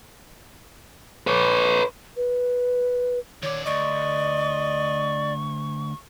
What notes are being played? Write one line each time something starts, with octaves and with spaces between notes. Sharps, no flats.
B4 C#5
B4
D#3 C#5 D5
D2 D5 D#5 C#6